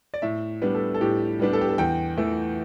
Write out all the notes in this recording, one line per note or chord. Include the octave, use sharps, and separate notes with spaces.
D5
A2 E5
G3 B3 D4
A4
A4
A2 G4
G3 B3 D4
A4
G4
A4
E2 G5
E3 A3